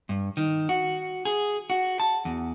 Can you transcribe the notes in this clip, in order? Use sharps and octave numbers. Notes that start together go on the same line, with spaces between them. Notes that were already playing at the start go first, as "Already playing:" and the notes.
G2
D#3
F#4
G#4
F#4
A5
E2